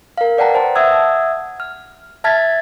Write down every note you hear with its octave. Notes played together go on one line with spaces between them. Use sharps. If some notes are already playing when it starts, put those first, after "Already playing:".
A#4 F5
B4 D5 F#5 G5 A5 A#5
C5 A5
E5 F#5 D#6 E6 G#6
F6
E5 A5 F6 G#6 A6 B6